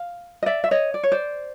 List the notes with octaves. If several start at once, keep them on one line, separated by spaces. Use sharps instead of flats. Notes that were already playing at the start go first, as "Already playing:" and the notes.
Already playing: F5
D#5
D5 E5
E5
C#5 D#5
D5
C#5
C5 D5